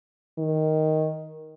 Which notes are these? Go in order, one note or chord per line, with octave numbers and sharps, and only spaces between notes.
D#3